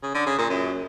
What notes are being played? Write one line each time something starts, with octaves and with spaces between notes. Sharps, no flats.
C#3
D3
C#3
A#2
F#2